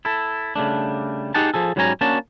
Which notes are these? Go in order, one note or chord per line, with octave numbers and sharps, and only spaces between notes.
E4 A4
C#3 G3 A3 D4
D#4 G4 G#4 F#5 G5 A5
F3 G#4 A4
G#2 F#3 G3 C#4 G#5 A#5
A#3 C#4 D4 F#4 A5